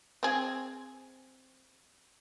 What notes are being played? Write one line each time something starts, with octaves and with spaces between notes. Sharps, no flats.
C4 G#4